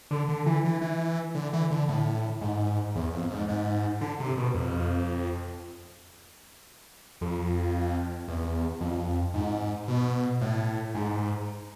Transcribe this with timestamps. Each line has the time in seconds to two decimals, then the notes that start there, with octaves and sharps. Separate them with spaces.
0.11 D3
0.29 D3
0.46 E3
0.65 E3
0.81 E3
1.35 D3
1.53 E3
1.70 D3
1.89 A2
2.41 G#2
2.95 E2
3.13 F2
3.31 G#2
3.48 G#2
4.01 D3
4.20 C3
4.37 B2
4.55 F2
7.21 F2
8.28 E2
8.81 F2
9.34 G#2
9.88 B2
10.41 A2
10.95 G#2